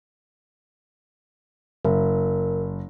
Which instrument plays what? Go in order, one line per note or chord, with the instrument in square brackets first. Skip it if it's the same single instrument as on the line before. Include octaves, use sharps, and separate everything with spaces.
[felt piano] F#1 [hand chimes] A#4